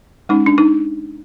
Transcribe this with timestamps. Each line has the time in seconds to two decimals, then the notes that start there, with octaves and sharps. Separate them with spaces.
0.29 G#3 C#4 D#4
0.46 D4
0.58 D#4